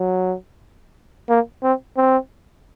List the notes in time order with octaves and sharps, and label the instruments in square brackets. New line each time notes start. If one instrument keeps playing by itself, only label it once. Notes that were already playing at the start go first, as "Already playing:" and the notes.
Already playing: [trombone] F#3
A#3
C4
C4